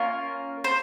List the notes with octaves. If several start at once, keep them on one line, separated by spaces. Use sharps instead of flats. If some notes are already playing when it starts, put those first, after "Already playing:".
Already playing: A#3 C#4 F4 A#4
C5